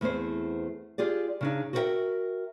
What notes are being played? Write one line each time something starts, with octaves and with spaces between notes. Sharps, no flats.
E2 A3 B3 C4 C5
F4 G4 G#4 D5
C#3 D4 D#4
F#4 G4 A#4 C5 E5 G5